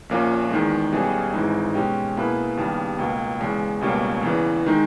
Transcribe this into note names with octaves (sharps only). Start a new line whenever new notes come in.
A#1 A#2 A#3 C#4
E2 D#3 G#3
B1 B2 G3 C#4 G#4
G#1 G#2 E3 G#3 D#4
B2 G#3 C#4 G4
B2 A#3 E4 G#4 B4
D#2 C#3 G3 B3
C#2 B2 A#3
E2 C#3 G#3
C#2 B2 G3 A#3 C#4
E2 C#3 E3
D#3 G#3 D#4